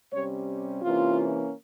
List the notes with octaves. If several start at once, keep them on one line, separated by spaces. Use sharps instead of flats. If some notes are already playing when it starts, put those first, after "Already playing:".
C3 G3 C#4 C#5
C3 E3 A#3 C#4 F4